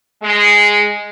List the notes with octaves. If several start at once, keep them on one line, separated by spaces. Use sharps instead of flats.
G#3